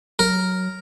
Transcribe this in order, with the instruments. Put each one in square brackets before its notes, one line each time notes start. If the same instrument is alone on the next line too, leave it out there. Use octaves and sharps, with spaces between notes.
[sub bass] F#3 [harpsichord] A#4